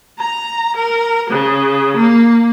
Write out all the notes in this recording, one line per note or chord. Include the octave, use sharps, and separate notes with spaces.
A#5
A#4
C#3
A#3